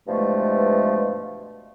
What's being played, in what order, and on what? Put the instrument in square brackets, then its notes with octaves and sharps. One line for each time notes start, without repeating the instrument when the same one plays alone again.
[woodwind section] G2 B2 E3 F3 G#3 A3